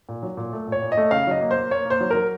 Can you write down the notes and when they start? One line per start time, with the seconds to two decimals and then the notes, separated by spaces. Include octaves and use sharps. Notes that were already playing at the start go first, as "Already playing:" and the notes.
0.09 A#2
0.23 F#3
0.37 A#2
0.53 A3
0.67 A#2 C#5
0.82 A#2
0.92 D#5
0.97 A3
1.11 C#3 F5
1.27 F#3 D#5
1.41 A#3
1.51 C5
1.57 A#3
1.71 A#3 C#5
1.85 A#3
1.90 C5
2.00 F#3
2.11 F#3 A#4